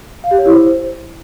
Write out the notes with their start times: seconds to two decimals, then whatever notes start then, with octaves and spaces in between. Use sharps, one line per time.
0.24 F5
0.31 G4
0.38 C#5
0.46 E4
0.53 C5